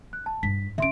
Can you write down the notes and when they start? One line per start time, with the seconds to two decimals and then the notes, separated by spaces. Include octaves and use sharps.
0.13 F#6
0.26 A5
0.43 G2 B6
0.78 C#3 C#4 E5 C6 D7